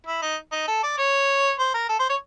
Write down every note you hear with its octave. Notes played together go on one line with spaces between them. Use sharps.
E4
D#4
D#4
A4
D5
C#5
C5
A#4
A4
C5
C#5